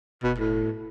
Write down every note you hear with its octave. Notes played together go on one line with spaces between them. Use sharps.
F1 B2
A2